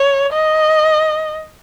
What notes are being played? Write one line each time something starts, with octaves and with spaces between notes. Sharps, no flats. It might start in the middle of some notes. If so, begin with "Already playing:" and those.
Already playing: C#5
D#5